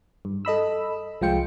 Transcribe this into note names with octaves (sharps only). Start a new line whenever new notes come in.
G2
A4 D#5 B5 E6
C2 F3 G#3 F4 G5 C#7